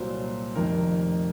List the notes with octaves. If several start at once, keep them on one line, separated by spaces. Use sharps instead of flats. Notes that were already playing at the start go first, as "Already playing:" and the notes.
Already playing: C2 A#2 F#3 C5
F1 F2 D#3 A#4